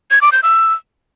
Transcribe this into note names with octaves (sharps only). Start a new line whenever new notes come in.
G#6
D6
G6
E6